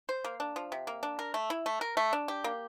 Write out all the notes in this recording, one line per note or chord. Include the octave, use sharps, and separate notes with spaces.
C5
A#3
D4
F3
C3
A#3
D4
A#4
A3
E4
A3
A#4
A3
D4
G4
A#3